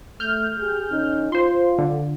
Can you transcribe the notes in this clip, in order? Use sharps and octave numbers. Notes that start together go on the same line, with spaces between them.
A3 F6 G6
G4 G#4
D3 C#4 D#4
F4 C5 C6
D3